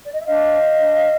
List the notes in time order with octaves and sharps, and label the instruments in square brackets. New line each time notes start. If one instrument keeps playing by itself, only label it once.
[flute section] D5
D#5
E5
D4 D#5 F5
C5
D4